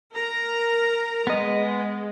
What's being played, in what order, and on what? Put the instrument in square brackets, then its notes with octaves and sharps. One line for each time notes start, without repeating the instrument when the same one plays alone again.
[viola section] A#4 A#5
[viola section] G#3 [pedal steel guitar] B3 D#5